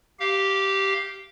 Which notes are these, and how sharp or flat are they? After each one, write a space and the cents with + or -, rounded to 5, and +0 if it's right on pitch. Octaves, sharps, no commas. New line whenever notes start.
G4 -10 F5 +0